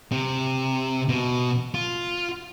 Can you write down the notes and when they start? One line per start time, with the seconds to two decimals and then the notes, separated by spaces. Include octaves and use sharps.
0.11 C3
1.09 B2
1.74 F4